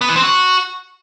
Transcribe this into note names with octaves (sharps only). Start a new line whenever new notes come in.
B3
E3
C4
F#4